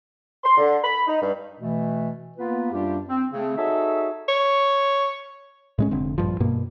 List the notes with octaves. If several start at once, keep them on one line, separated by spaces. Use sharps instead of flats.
C6
D3
B5
D#4
G2
B2 E3 A3
A#3 B3 F4 B4
F#2 G3 D4 F4 G4
C4
C#3 A3 C4
D#4 F#4 G#4 A4 C#5 E5
C#5
A2 G#3 C#4
F1 D3 C4
A#1 G2 F3
G2 B2 A#3